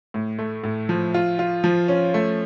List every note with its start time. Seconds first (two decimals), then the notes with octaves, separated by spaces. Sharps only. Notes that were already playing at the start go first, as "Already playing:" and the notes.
0.14 A2
0.39 A3
0.64 A2
0.89 F3
1.14 F4
1.39 F4
1.64 F3
1.88 C#4
2.14 A3